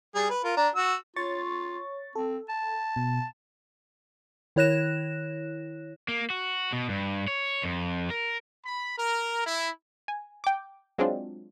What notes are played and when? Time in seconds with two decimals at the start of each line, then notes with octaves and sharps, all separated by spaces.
0.15 G3 G#4
0.30 B4
0.44 F4 A#4
0.57 D4 A#5
0.75 F#4 E6
1.16 F4 C#5 C#6 A6
2.15 C4 A4
2.49 A5
2.96 B2
4.56 D#3 E4 C#5 F#6 A#6 E7
6.08 A#3
6.30 F#4
6.73 B2
6.89 G2
7.28 C#5
7.63 F2
8.10 A#4
8.65 B5
8.98 A#4
9.45 E4
10.08 G#5
10.44 G5 D6
10.98 F#3 G#3 C4 D4 F4